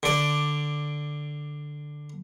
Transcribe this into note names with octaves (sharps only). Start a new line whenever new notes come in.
D3 D5